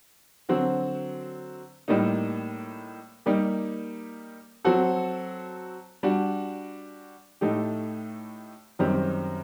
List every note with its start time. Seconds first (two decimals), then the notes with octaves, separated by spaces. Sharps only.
0.49 D3 F#3 C4 F#4
1.88 A2 G3 A#3 D#4
3.26 G3 A#3 D#4 G4
4.65 F#3 C4 F#4 A4
6.03 G3 D4 F#4
7.41 A2 A3 D#4 G4
8.79 F#2 D#3 G3 C4 G4